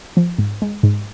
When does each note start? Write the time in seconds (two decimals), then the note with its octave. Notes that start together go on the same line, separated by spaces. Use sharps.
0.17 F3
0.38 G#2
0.62 G#3
0.83 G#2